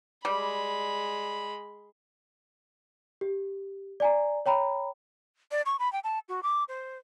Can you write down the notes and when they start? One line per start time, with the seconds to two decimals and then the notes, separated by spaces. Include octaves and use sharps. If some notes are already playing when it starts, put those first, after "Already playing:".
0.25 G3 G#3 B5
3.21 G4
4.00 D5 G#5 A#5
4.46 C#5 G5 A#5 B5
5.51 D5
5.66 C#6
5.79 B5
5.93 G5
6.04 A5
6.29 F#4
6.43 D6
6.68 C5